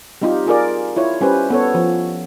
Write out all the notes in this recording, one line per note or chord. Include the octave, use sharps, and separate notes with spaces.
G3 C4 D#4 F4 G4
F4 G#4 A#4 D5
E4 F4 C#5
G3 C#4 G4 B4 C5
B3 A4 C#5
F3